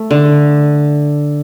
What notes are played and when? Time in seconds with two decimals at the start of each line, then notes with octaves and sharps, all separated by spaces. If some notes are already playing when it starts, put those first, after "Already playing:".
Already playing: A3
0.11 D3